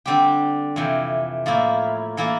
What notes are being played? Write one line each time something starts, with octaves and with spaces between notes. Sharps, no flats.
D3 G3 C4 G4
F2 C3 E3
A2 F3 A#3 E4
E3 A#3 E4 A4